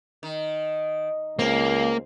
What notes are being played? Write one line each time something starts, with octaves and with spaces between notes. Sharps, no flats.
D#3
C#2 A#3 C4